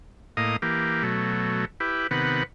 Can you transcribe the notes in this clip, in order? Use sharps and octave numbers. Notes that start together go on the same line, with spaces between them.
A2 A#3 D#5 F5 D#6
E3 A#3 G4
B2 F#3 A3
E4 G4 B4
C3 D#3 B3 B4 F#5